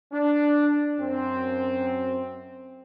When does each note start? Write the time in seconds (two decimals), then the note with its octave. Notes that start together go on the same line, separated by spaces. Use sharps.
0.12 D4
0.98 F#2 C4